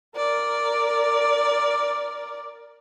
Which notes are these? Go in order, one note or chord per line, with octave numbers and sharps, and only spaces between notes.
A#4 D5